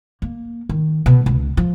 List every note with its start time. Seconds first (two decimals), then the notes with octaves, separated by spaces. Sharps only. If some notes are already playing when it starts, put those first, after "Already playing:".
0.22 A#3
0.69 D#3
1.06 B2
1.26 C#2
1.57 F3